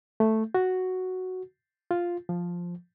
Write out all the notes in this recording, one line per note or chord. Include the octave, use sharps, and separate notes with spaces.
A3
F#4
F4
F3